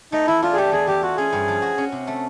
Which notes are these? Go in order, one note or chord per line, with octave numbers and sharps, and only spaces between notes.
A3 D#4
E3 E4
D4 F4
G#4
A3 G4
E2 G#4
E3 G4
F4 F#4
C#4 G#4
G2
F3
F#4
C#4
C3
A3